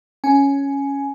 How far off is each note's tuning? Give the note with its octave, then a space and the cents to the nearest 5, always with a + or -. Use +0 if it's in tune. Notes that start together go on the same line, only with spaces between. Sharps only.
C#4 +0 G#5 +10